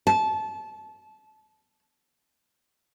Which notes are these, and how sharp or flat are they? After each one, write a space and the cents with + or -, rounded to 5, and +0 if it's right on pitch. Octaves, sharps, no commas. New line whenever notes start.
A5 -25